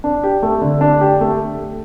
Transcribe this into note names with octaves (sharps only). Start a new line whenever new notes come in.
D4
G4
A3
D3
D4
G4
A3